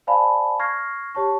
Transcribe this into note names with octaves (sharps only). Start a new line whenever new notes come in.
C5 D5 F5 G#5 A5 B5
C#6 F6 G#6 A#6 C7
G4 C#5 A5 C#6